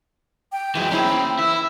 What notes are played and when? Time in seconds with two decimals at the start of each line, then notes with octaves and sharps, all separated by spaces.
0.52 G5
0.75 F#2 E3 F#3 G#3
0.91 A#3 C#4 E4 G#4 C5
1.39 E3 E4 E6